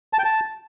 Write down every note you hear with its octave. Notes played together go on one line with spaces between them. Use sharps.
A5
G5
A5